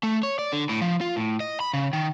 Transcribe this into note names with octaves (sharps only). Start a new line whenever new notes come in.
A3
C#5
D5
D3
A2
F3
F4
A2
D#5
B5
C#3
D#3